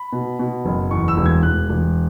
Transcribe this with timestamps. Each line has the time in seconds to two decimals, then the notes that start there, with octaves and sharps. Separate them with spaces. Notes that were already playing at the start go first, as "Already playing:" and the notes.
Already playing: B5
0.12 B2
0.39 B2
0.65 F#1
0.91 E2 C#6
1.08 E6
1.17 E1
1.26 G#6
1.43 E1 F#6
1.69 E1